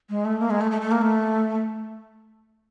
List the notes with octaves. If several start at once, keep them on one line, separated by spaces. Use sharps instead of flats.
G#3
A3
A#3
G#3
A3
A3
A3
A#3
A3